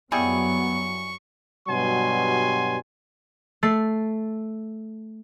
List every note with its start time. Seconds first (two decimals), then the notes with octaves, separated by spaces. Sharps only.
0.12 F#2 F#3 G3 B3 E4 G#4 C#6
1.69 G2 B2 F#3 G3 G#5 C6
3.63 A3 A6 C7